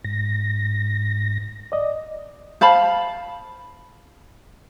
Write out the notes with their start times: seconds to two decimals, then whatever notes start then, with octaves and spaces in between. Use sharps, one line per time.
0.04 G#2 A#6
1.72 D5 D#5
2.61 C5 F5 A5 B5